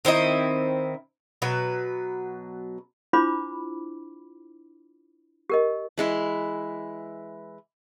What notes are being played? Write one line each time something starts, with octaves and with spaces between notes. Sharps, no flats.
D#3 C4 E4 D#5
B2 F#3 B4
D4 E4 F4 C5 B5 D6
G4 A#4 D#5
E3 G#3 E4